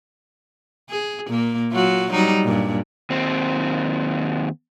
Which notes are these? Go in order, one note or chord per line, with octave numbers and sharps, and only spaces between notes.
G#4
A#2 A#3
F#3 F4 F#4
F#3 G3 D#4
G2 A#2
D#2 C4